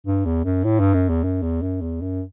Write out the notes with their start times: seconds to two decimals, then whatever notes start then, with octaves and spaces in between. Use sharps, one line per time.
0.07 G2
0.25 E2
0.44 F#2
0.64 A2
0.79 G2
0.94 F#2
1.09 E2
1.24 F#2
1.42 E2
1.62 F#2
1.81 E2
2.02 F#2